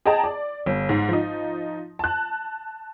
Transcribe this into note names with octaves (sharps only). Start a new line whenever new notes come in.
G#4 D#5 G5 A5 A#5
D5
G1
G#2
F3 D#4
A5 F#6